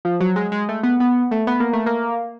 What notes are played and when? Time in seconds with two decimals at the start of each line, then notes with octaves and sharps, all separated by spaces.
0.05 F3
0.20 F#3
0.36 G#3
0.52 G#3
0.69 A3
0.83 B3
1.00 B3
1.31 A3
1.47 B3
1.60 A#3
1.73 A3
1.86 A#3